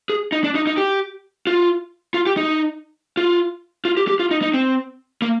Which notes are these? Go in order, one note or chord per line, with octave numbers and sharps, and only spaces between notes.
G#4
D#4
D4
D#4
D#4
G4
F4
F4
G4
D#4
F4
F4
G4
G4
F4
D#4
D#4
C4
A#3